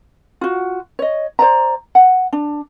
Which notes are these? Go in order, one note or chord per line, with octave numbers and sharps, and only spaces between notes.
F4 F#4
C#5 D#5
C5 D5 A#5
F#5
D4